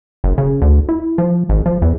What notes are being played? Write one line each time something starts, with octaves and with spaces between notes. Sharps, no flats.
F#1
C#3
D2
E4
F3
G#1
F3
E2